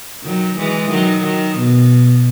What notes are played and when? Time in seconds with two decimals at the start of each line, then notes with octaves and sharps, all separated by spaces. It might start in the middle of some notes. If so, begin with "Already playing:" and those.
0.24 D#3 F#3
0.58 E3 G#3
0.91 D#3 F#3
1.24 D#3
1.58 B2